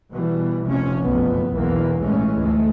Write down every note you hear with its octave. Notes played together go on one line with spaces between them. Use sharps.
B2 E3 G3
F1 C3 F3 C#4
F#1 B1 F2 A2 B3
B1 E2 G2 E3 A#3 B3
A#1 G#2 E3 G#3 A3 C#4
D2 G#3 A3